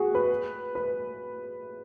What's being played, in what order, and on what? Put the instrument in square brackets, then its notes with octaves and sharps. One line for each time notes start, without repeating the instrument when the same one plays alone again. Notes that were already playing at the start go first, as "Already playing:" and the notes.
Already playing: [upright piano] F#4 G#4
B4
B4